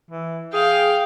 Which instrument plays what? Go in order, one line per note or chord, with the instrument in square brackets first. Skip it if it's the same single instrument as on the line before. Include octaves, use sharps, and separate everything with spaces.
[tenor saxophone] E3
[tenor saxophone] G#4 [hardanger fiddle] F5 G5